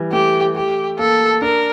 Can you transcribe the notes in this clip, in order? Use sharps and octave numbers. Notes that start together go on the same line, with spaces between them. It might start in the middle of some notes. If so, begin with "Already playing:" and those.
Already playing: E3 G3
A3 G4
G4
A#3 A4
D4 A#4